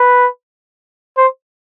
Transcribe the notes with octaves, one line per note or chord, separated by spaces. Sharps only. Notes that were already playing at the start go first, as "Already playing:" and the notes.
Already playing: B4
C5